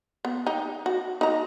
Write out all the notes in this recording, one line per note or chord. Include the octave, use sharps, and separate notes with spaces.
B3
D#4 G4
F#4
D#4 A#5